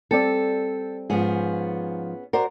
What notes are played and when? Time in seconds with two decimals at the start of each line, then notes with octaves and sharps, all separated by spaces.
0.11 G3 C4 A4 D5
1.10 G#2 F3 B3 C#4 G#4
2.33 F#4 A#4 C5 D5